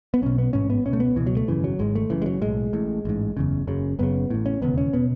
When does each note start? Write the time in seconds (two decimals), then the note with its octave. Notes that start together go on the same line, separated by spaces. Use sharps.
0.14 B3
0.22 B1 B2 C#4
0.38 B3
0.53 A1 G#2 C#4
0.70 B3
0.85 C#2 B2 C#4
0.93 A3
1.00 B3
1.16 C#2 B2 E3
1.26 F#3
1.37 A3
1.48 G#1 F#2 C#3 E3
1.64 F#3
1.79 G#1 G#2 G#3
1.95 A3
2.10 F#1 F#2 C#3 E3
2.22 G#3
2.26 F#3
2.41 B1 A2 G#3
2.73 A1 A2
3.05 A1 G#2
3.37 F#1 E2 C#3
3.67 F#1 F#2 C#3
3.99 F#1 F#2 C#3 B3
4.30 A1 A2
4.46 C#4
4.62 E1 D#2 C#3 B3
4.78 C#4
4.93 B2 B3